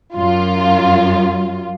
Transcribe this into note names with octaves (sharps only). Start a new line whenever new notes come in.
F#2 F4